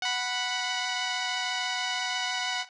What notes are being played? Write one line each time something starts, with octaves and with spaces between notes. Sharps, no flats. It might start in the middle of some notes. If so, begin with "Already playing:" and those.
F#5 B5